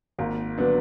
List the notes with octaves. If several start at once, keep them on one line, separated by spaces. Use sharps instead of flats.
G#1 A#3
D3 F#3 B3 D4